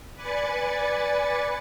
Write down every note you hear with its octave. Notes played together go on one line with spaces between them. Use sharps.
B4 D5 G#5 B5 A6 C#7